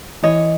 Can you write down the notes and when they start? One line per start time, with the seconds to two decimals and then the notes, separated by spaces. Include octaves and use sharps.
0.22 E3 C#5 D#5